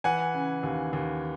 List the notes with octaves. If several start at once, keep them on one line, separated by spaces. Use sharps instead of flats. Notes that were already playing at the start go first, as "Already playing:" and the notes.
E3 F#5 G#5
C#3
D#2
D#2